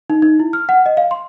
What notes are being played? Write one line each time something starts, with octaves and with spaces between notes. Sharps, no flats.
D#4
D#4
E4
F6
F#5
D#5
F5
C6